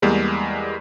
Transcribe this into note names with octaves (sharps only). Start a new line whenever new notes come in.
E2 G3 G#3 A#3